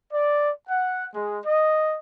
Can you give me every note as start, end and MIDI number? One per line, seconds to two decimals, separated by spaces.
0.11 0.49 74
0.67 1.06 78
1.13 1.39 56
1.44 1.97 75